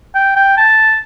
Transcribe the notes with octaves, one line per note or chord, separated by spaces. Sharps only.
G5
G5
A5